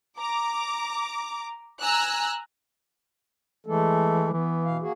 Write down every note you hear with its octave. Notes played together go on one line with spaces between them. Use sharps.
A#5 D6
G#5 A#5 E6 F#6
E3 G#3 A3 A4
E3 B3
B2 F5
A#3 F#4 G#4